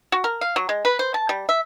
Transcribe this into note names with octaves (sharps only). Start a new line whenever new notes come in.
F#4
A#4
F5
F#3
G#3
B4
C5
A5
G3
E5